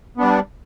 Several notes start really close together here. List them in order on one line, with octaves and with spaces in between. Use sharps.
B3 D4 G3